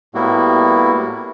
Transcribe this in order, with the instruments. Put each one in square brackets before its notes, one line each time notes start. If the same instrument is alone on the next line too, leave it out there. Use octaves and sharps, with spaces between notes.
[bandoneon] A2 G3 A#3 B3 E4 F#4